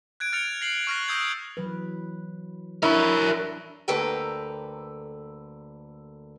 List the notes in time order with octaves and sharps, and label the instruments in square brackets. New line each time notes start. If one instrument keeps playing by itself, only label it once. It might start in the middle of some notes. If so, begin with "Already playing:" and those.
[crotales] F#6 G#6 D7
F6 A6 C#7 D7 F7
A#6 C7 F#7
C#6 F6 F#6 A#6
D#6 E6 G6 G#6
[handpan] E3 F#3 B4
[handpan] D4 [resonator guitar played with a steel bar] E4 [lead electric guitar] A#4 C#5
[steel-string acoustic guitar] D2 A#3 A4 B4 G5 A#5